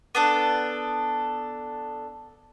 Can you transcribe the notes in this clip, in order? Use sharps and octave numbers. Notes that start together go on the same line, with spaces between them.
B3 D4 A4